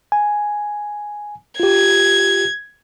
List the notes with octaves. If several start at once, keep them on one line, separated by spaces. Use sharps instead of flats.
G#5
F4 G4 G#6